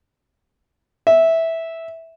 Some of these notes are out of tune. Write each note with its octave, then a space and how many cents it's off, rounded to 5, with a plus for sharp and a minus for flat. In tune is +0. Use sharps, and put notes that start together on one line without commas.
E5 -10